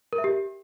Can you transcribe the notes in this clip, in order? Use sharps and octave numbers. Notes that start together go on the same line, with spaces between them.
A#4
E5
G4